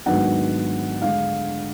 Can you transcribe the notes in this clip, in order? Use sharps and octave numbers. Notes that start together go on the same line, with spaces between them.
G#2 D#3 F#3 B3 D4 F#5
D3 G#3 D4 F5